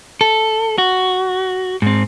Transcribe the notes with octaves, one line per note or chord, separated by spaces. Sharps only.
A4
F#4
G#2 C4